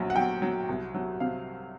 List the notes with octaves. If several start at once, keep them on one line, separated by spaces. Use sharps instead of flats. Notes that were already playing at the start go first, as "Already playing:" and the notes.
Already playing: A#1 F#3
F#5
F#3 G5
F#3
C2
F#3
C3 F5